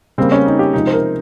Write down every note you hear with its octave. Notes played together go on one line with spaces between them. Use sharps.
C#3 G3 A#3 C4
C#4
D#4
G4
C3 F3 G#3 D#4
C5
A#4